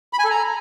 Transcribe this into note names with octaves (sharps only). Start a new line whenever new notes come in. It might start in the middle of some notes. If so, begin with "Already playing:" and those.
B5
G#5
A4
A#5